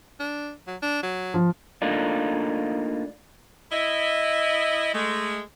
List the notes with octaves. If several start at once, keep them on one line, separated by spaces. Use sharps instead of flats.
D4
F#3
D4
F#3
F3
A3 A#3 D4 D#4 F4
E4 D#5
G#3 A3